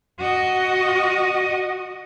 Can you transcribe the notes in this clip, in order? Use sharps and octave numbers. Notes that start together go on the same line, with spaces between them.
F#4 D#5